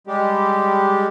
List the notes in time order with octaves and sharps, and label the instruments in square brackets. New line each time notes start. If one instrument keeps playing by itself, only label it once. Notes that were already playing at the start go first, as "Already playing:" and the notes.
[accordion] G3 G#3 G4